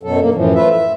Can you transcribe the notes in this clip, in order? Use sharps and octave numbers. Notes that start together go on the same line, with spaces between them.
F#2 B2 F#3 A4
G2 A#3
F#2 A2 E3 F3
A3 F4 B4 E5
E5